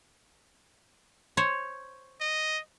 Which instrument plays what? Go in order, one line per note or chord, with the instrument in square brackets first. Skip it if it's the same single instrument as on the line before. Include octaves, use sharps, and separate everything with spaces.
[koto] C5 C#5
[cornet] D#5